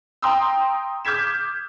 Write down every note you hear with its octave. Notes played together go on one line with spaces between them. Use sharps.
G5 A#5 C6 D#6 E6
D6 F6 G6 G#6 B6 E7